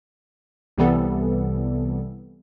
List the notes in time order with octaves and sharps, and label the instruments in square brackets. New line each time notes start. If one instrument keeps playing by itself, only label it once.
[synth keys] C2 C3 E3 G3 B3 A4